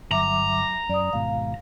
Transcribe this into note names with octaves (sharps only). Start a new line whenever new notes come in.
G1 F#3 E5 A#5 D6
F#2 D5 D#6
G#1 G#2 B2 F5